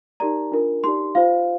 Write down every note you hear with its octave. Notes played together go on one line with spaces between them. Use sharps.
D#4 G4 A#4 D5 A#5
D4 F4 A#4
D#4 G4 D5 C6
F4 C5 F5